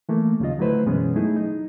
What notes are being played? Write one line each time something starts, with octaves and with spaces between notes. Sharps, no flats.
E3 A3 A#3
D#2 C#3 F#3 F4 D#5
D3 F#3 A3 E4 B4 C5
F#2 B2 E3 G#3 B3 C#4
F#3 A3 D#4 E4 G#4
D#4